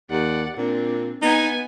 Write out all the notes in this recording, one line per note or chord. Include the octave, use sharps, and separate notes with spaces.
D#2 D5 F#5
A#2 C4 D4
B3 D#4 G#5